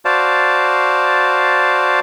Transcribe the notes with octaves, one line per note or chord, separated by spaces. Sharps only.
F#4 C5 D5 F5 A5